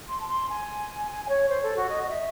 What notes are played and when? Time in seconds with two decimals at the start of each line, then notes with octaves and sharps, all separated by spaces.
0.08 C6
0.20 A5
0.28 C6
0.49 G#5
1.09 G#5
1.29 C#5
1.49 C5
1.63 A4
1.76 F#4
1.89 D#5
2.03 D#5
2.09 E5